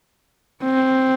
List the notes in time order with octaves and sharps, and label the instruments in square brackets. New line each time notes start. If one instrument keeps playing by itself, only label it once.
[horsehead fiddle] C4